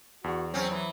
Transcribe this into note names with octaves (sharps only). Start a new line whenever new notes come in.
E2 F#4
F#3 C4 C#4
E3